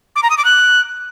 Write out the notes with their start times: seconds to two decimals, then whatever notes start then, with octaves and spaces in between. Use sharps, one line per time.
0.16 D6
0.23 A#5
0.30 D#6
0.38 D6
0.45 F#6